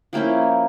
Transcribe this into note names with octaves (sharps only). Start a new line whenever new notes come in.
F3 A#3 C#4 E4 G5